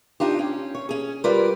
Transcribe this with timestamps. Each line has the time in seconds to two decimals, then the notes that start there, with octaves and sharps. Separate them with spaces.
0.20 D4 D#4 F4 G4
0.39 C#4
0.75 C#5
0.89 C#4 G#4
1.24 G3 F4 A#4 B4 D5